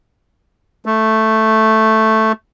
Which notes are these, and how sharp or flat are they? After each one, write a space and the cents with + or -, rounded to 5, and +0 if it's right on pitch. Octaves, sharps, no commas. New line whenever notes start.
A3 +0